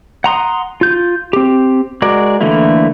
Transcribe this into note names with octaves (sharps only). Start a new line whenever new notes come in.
F#5 A#5 C6 D#6
F4 G6
C4 G4
G#3 F#4 A#4 D5
D3 E3 A3 A#3 E4